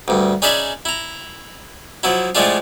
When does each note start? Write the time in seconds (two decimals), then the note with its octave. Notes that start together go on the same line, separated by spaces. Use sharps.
0.08 D2 G2
0.42 C#4 D#4 G#4 D5 E5 B5
0.85 E4 A#5
2.03 F3 F#3 E4
2.35 A2 F3 G#3 A3 D4 F4